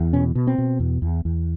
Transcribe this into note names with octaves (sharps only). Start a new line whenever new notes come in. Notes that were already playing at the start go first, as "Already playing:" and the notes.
Already playing: E2
B2 C#4
B2
C4
B2
E2
E2
E2